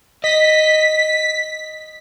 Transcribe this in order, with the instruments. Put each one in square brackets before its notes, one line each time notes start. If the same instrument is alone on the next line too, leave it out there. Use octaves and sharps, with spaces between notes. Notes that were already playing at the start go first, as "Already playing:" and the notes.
[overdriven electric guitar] D#5 [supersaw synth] B6